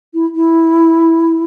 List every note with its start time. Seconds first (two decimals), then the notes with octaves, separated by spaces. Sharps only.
0.14 E4
0.35 E4